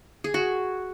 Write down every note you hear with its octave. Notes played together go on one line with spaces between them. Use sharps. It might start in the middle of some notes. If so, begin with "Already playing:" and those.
G#4
F#4